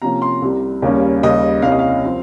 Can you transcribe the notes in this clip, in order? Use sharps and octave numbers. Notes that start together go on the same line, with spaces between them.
C3 F3 A#3 C#4 A#5
C6
C2 C3 G3
D#2 C#3 G3 A#3 C#4
D#2 C#3 G3 D#5
C2 C3 G3 A#3 C#4 F5
D#5
F5
F3 C4